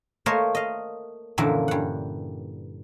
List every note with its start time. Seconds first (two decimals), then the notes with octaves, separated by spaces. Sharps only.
0.26 A3 A#3 A#4 C5 C#5 D#5
0.55 D#5 F5
1.38 F#2 A#2 D3 E3 F3
1.68 G2 F#5